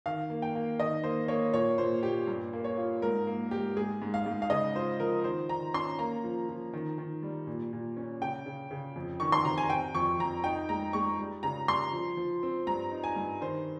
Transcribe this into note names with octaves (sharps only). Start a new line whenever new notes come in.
D#3 F5
A#3
G5
A#3
D#3 D#5
A#3 C5
A#3 C#5
A#2 C#5
A#2 C5
A#2 G4
G2
A#3
C#5
F4
G#2 A#4
A#3
G#2 G4
G#3 G#4
G#2
F5
G#2
F5
C#3 D#5
F4 C5
F3 A#4
D#3 C5
D#3 A#5
C#4 C6
A#3 A#5
F3
F3
D#3
D#3
G3
A#2
A#2
C#4
C#3 G5
C#3
C#3
F2
D#3 C#6
C6
C3 A#5
G#5
C3 G5
F2 C#6
F2 A#5
D#4 G5
G#3 A#5
G#3 C#6
G3
C#3 A#5
G3 C6
F3
F3
C4
G2 A#5
D#4
G#5
G2
D#3 C5